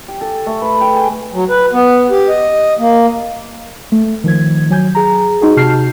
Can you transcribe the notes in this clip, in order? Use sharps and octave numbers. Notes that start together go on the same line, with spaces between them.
G4
A4
A3
B4
G5
G#4
F#3
B4
B3
G4
D#5
A#3
A3
D#3 F3 G#6
F#3 G#5 G6
G#4 A#5
D#4 F#4 G#4
C3 F#4 A5 F6 G6 C7